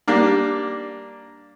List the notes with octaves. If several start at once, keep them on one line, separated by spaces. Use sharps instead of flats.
G3 A#3 D4